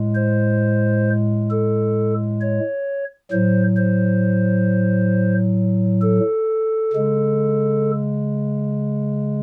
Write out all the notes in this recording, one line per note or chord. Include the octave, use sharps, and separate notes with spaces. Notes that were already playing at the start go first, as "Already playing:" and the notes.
Already playing: A2 G#3
C5
A4
C#5
A2 F#3 C5
C5
A4
C#3 G#3